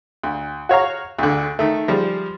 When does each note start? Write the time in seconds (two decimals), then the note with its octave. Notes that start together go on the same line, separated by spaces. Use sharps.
0.23 D2
0.69 F#4 C#5 F5 A#5
1.18 D2 D3
1.59 D#3 A3
1.88 F3 G3 G#3